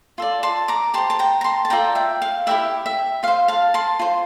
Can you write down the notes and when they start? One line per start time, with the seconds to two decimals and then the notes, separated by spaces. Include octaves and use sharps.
0.18 F4 A4 D5
0.43 A5 C6
0.68 A#5 D6
0.94 G4 C5 A5 C6
1.10 A5
1.19 G5 A#5
1.41 A#5
1.44 A5 C6
1.65 A5
1.70 F4 A4 D5 G5 A#5
1.95 E5 G5
2.22 F5
2.47 E4 G4 A#4 D5 E5 G5
2.86 E5
3.23 F4 C5 F5
3.48 F5 A5
3.74 A5 C6
3.99 F4 C5